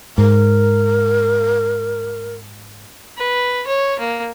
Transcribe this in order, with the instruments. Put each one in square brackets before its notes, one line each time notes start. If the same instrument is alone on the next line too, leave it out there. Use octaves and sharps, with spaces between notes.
[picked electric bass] G#2 [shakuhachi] A#4
[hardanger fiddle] B4
C#5
A#3